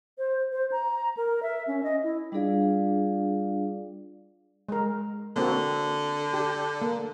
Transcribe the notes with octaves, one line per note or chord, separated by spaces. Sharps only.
C5
C5
A#5
A#4
E5
C#4
D#5
E4
G3 D4 F4 G#4 D5 F5
G#3 A#4
D3 A#3 C4 F#4
G4
A#3